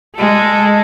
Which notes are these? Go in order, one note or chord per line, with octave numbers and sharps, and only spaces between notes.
G#3 A4